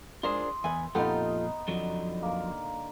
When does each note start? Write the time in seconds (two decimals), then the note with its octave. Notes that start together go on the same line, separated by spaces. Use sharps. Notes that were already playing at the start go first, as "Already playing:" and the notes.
0.23 G#3 D4 F4 A#4 C5 C6 D#6
0.64 E2 B4 E5 G#5
0.95 F2 A#2 B3 D#4 F4 G4 A4
1.68 F2 D3 F3 F#3
2.23 A#3 A#4